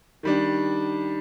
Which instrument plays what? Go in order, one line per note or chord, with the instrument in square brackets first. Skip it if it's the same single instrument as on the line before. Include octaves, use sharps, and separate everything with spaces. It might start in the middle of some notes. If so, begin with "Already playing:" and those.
[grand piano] D#3 G3 D4